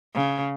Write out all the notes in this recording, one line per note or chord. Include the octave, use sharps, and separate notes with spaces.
C#3